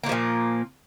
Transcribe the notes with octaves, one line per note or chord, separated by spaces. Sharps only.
A#2 D#3 F3 A#3